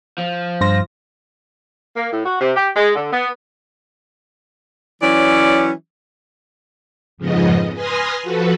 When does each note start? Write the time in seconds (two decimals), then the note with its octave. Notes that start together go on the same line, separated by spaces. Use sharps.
0.18 F3
0.61 G2 C5 A#6
1.97 A#3
2.12 A2
2.25 F#4
2.41 C3
2.57 G4
2.75 G#3
2.95 D3
3.13 B3
5.03 E3 F#3 C#4 D5
7.18 F2 G#2 C#3 F3 B3 D#5
7.74 B4 G#5 C6 D#6 F6 A#6
8.23 F3 F#4 A4 B4